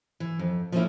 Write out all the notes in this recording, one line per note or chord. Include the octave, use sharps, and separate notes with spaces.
E3
F2
F3 A3 A#3 C4 C#4 E4